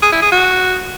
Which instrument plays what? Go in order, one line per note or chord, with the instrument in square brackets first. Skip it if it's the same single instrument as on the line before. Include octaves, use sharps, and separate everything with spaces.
[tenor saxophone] G#4
E4
G#4
F#4